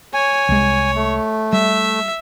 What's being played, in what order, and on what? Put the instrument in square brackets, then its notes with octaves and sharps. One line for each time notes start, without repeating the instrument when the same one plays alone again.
[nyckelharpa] C#5 [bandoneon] G#5
[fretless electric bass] C2 G#3
[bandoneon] A3
[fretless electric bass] G3 [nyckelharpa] E5